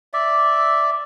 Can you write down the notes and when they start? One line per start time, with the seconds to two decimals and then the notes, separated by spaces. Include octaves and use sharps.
0.13 D5 E5